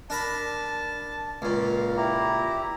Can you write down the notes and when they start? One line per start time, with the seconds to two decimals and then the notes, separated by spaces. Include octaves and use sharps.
0.10 D4 A#4 A5 B5
1.42 C#2 A#2 F5
1.96 E4 G4 A#5